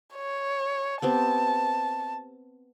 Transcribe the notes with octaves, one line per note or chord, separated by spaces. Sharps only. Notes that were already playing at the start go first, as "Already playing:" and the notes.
C#5
B3 C4 G4 A5